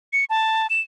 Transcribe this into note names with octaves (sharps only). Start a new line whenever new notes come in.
C#7
A5
E7